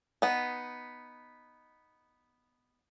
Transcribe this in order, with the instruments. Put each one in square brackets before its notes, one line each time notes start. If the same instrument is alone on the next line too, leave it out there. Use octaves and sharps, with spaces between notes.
[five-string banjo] B3 D#4